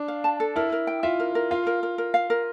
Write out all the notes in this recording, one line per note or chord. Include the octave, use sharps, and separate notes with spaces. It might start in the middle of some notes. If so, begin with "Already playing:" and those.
Already playing: D4
F5
A5
A4
E4 A#4
A#4
G5
F4 E5
A#4
A#4
F4 F5
A#4
A#4
A#4
F5
A#4